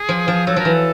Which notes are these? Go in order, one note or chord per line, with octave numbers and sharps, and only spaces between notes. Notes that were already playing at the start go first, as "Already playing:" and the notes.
Already playing: G#4
F3
F3
F#3 A4
F3 A#4
E3
A4